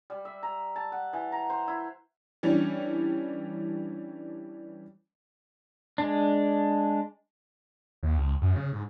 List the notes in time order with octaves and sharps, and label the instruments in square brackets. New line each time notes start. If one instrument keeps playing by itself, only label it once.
[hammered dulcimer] G3
E5
A#5
A5
F#5
E3
A#5
C5
E4
[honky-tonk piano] E3 G3 C#4 D4
[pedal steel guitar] G#3 D4
[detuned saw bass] D#2
C#2
F#2
C#3
G#2